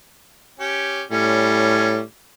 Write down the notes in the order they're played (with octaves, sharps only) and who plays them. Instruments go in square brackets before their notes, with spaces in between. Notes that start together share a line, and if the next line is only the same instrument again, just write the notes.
[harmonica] C#4 G4
[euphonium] A2 [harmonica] G3 C#4